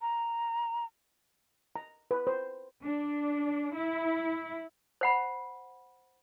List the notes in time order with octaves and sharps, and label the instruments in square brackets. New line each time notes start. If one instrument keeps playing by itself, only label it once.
[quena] A#5
[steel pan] A#5
B4
C5
[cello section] D4
E4
[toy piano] C5 F#5 B5